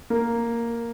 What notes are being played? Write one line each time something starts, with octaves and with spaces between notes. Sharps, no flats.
A#3